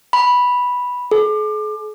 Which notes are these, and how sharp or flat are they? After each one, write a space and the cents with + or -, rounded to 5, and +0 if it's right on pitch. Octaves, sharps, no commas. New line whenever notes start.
B5 -5
G#4 +45